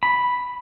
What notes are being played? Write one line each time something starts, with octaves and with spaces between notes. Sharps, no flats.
B5